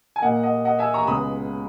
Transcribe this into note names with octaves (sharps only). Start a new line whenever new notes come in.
G#5
A#2 A#3 D#5 F#5
D#5 F#5
D#5 F#5
E5 G#5
A#5 C#6
C#2 C#3 G#3 B3 B5 D#6